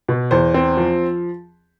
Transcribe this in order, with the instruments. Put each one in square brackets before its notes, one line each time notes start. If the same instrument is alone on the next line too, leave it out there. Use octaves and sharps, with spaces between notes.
[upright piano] B2
E2 C5
C4
F3